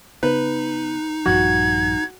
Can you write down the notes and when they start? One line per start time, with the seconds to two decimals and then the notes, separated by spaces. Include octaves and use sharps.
0.23 C#3 B3 D#4 B4
1.26 A#1 G2 F3 F#4 G#6